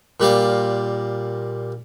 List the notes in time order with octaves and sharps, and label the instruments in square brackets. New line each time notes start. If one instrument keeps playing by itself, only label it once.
[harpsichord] A#2 G3 F5